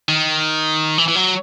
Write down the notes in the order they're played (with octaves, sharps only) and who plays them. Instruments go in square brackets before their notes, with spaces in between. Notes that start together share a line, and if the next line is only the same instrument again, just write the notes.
[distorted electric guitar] D#3
E3
E3
F#3